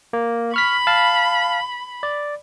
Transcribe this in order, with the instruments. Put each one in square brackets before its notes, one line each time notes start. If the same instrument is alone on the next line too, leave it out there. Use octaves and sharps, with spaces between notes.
[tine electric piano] A#3
[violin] B5 [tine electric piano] C#6 F6 B6
[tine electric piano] F5 A5
D5